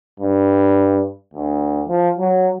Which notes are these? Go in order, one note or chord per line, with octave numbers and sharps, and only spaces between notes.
G2
D2
F3
F#3